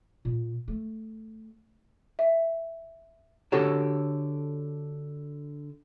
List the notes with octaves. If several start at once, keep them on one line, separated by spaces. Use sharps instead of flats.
A#2
A3
E5
D3 F#4 G4 A4 C#5 A5